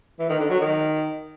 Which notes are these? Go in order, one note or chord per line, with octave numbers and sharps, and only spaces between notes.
E3
D#3
D3
F#3
D#3